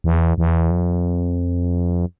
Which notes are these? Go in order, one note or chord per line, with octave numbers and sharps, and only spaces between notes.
E2
E2
F2